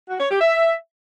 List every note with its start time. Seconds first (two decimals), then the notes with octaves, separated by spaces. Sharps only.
0.09 F#4
0.20 C#5
0.30 G4
0.41 E5